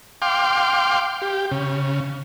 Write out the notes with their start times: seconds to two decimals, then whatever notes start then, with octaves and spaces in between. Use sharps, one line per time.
0.22 F5 G5 C6 D6
1.22 G4
1.52 C#3